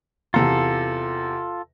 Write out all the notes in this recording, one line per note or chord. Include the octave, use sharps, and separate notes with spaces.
E2 C3 F4 A4 A#5